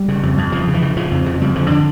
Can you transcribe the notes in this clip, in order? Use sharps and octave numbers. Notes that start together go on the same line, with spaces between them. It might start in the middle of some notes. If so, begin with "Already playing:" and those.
Already playing: G3
C#3
F2
F2
C#3 F3
C#3
E3
C#3
C#3 F3
F2
C#3
F2 G3
D3 F3
D3 D4